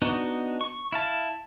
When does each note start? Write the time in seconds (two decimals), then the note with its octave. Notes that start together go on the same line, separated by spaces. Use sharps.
0.02 B3 D4 D#4 F#4
0.61 C#6
0.92 E4 F5 A5